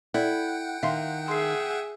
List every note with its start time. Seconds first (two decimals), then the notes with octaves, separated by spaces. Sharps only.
0.14 E4 A4 D5 F#5 G5
0.83 D#3 E5 F5 C6
1.28 G#4 E5 C6 C7